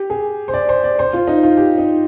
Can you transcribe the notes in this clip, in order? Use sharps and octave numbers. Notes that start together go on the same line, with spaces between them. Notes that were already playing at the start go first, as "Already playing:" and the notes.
Already playing: G4
G#4
C5
D5
C5
D5
C5
F4
D#4
F4
G4
D#4